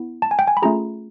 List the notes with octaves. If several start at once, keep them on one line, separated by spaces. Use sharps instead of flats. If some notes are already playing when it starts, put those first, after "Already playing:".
Already playing: B3 E4
A5
G#5
G5
G#5
B5
A3 C#4 F4 G#4 A#5